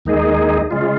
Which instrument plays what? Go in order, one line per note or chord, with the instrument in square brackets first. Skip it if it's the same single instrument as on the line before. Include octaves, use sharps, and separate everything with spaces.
[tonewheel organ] D#2 D#3 G#3 D#4 G#4
C#3 G#3 F4